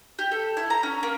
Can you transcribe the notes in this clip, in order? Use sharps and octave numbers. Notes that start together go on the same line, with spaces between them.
G4
A4
E4
A#5
C#4
A#3